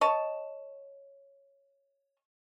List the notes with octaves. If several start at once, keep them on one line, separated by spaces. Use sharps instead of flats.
C#5 D#5 A5